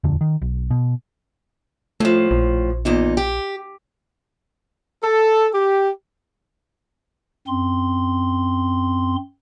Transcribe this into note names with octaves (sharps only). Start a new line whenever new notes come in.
D#1 F2 D3
D#3
B1
B2
A2 F3 A3
A#1
E2 A#2 D#4
G4
A4
G4
F#2 C4 C6